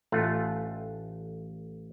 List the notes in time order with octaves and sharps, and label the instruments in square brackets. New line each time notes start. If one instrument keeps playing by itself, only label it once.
[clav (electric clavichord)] A1 A3 F4 F#5